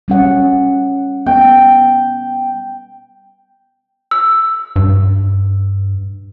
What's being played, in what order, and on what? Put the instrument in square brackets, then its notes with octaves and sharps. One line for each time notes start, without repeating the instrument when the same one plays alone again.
[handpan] G3 C#4 F#5
[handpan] B3 [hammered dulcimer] G5
[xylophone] E6
[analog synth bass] G2